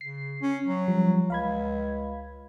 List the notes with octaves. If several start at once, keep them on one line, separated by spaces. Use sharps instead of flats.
C#3 C7
C#4
F#3
F3 G3
C#2 F5 B5 G#6